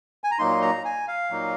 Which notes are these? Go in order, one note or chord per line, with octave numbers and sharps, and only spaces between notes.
G#5
A#5
A#2 F#3 A#3 D#4 C6
A#5
G#5
F5
A#2 F#3 A#3 D#4